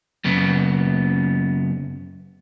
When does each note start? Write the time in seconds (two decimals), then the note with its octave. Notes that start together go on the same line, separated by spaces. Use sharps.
0.24 F#2 C#3 B3